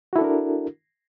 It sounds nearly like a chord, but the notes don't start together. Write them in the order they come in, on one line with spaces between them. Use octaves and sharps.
F#4 E4 A4 D4 A#4